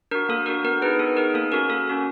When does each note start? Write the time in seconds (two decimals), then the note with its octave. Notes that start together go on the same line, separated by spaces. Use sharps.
0.11 D4 F#4 A#4
0.29 A#3 A4
0.46 D4 F#4 A#4
0.64 B3 A#4
0.82 D#4 G#4 B4
0.99 B3 A4
1.17 D#4 G#4 A#4
1.34 A#3 A4
1.51 C#4 F#4 A4 A#4
1.69 A#3 A4
1.87 C#4 F#4 A4